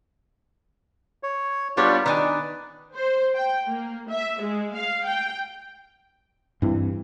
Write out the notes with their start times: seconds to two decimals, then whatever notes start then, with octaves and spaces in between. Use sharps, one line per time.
1.23 C#5
1.77 G3 B3 D4 F4 C#5 D5
2.06 D#3 D4 B4 G#5
2.95 C5
3.35 G5
3.67 A#3
4.09 E5
4.42 G#3
4.75 F5
5.06 G5
6.62 G2 E3 C4